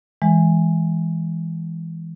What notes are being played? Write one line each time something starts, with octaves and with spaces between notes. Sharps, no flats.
E3 G#3